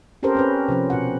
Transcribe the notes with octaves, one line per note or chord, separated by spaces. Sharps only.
C4 C#4 G4 A4 A#4 C5
C4 C#4 B4
C3 F3 C#4
B2 F#5